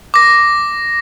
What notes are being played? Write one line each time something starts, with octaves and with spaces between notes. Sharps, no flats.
D6 A#6